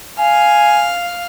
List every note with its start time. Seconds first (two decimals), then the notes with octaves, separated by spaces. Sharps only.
0.19 F5 G#5